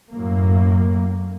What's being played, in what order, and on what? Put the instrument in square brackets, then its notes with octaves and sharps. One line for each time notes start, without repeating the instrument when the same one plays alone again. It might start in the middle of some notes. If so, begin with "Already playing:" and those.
[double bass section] F#2 A2 A#3